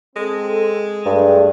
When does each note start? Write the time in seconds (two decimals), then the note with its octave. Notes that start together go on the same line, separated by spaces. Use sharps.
0.16 G#3 C4 A4
1.05 G2 A3 D4 G#4